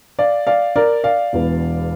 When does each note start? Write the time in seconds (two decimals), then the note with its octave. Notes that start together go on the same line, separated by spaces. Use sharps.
0.19 D5 F5
0.47 D5 F5
0.76 A#4 D5
1.04 D5 F5
1.33 E1 E2 E3